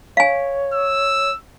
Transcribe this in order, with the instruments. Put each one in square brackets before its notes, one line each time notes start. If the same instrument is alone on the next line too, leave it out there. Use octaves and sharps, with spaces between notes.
[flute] C#5 [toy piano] F5 G#5
[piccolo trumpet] E6